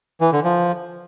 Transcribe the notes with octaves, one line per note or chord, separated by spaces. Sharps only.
E3
D3
F3